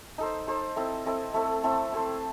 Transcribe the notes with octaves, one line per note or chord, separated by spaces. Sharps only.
D#4 A4 C5
D#4 A4 C5
C4 E4 A4 D#5
C4 E4 A4 D#5
A3 C4 E4 A4
A3 C4 E4 A4
E4 A4 C5